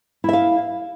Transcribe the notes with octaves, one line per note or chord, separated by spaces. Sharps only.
E4 E5 F5